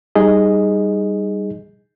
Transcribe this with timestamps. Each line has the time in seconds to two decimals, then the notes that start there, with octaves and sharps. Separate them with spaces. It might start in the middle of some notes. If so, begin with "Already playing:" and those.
0.15 G3 D#4 G#4 D#5